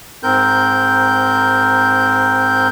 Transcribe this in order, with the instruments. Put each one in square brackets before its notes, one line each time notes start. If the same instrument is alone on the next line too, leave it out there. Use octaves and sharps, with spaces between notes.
[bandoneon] G#2 C4 A#4 G6